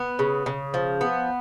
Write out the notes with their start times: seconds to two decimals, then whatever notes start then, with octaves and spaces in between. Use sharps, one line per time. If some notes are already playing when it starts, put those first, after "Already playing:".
Already playing: B3
0.19 C#3
0.46 C#3
0.74 F3
1.01 B3